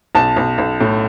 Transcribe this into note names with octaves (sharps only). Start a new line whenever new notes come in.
B1 A5
B1
B1
A2